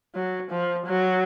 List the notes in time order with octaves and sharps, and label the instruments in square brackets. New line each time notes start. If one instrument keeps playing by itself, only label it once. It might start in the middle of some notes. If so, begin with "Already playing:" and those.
[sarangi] F#3
F3
F#3